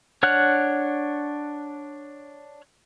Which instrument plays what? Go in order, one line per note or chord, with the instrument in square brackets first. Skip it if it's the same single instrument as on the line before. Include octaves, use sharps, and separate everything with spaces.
[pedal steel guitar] D4 C#5 F#5 F6 F#6